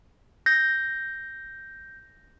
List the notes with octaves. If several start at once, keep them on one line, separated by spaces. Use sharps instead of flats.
G6 A#6